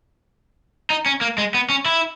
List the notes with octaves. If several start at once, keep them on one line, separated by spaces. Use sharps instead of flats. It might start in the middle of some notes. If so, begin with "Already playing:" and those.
D#4
C#4
A#3
G#3
B3
C#4
E4